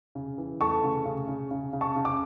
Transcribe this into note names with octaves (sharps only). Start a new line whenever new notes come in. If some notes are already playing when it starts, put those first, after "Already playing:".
C#3
E3
A3 A5 C#6
C#3
C#3
C#3
C#3
C#3
A5 C#6
C#3
D6